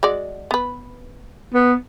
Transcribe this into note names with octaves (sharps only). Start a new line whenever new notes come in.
G#3 F#4 D5
B3 B4
B3